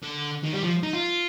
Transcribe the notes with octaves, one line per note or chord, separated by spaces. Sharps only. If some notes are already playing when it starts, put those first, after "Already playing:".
D3
D#3
G3
F3
D#4
F4